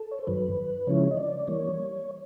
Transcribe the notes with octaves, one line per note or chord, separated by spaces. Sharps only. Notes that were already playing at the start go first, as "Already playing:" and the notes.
Already playing: A4
C#5
C5
G2 D#3 F#3 B4
C#3 F3 G#3 C#4 E4 C#5
D#5
D5
E3 G3 A#3 C#5